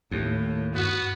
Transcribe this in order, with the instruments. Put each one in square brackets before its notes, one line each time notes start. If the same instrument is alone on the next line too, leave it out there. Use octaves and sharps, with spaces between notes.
[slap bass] D#2 [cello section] A2
[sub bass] G2 [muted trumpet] B3 [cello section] F#4